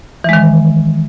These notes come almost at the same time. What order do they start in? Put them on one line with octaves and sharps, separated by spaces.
E3 G#3 D#3